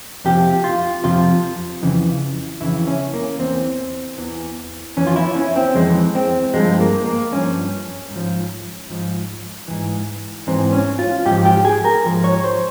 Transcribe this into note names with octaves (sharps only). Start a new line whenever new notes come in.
F2 C3 F3 G4
F4
F2 C3 F3 F4
F2 C#3 E3
F2 C#3 E3 E4
C#4
A#3
E2 E3 C4
E2 E3
F2 E3 C#4
F4
E4
C#4
C4
F2 E3 G#3
C4
G2 F3 G#3
A#3
A#3
G2 F3 C#4
G#2 F3
G#2 F3
G#2 E3
G#2 E3 C4
C#4
F4
G#2 F3 G4
G4
G#4
A#4
G#2 F3
C#5
C5